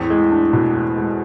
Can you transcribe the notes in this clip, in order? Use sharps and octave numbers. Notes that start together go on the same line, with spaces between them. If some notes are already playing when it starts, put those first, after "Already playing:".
Already playing: E2 A2 C4
G#3
D4
B2
E2
G#3